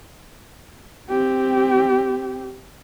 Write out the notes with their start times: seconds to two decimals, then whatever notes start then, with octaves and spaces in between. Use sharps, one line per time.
1.09 C4 G4